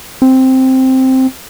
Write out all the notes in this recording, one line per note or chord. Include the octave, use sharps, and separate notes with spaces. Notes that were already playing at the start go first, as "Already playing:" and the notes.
C4